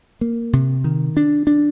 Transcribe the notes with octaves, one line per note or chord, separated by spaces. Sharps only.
A#3
C3
D#3
D4
D4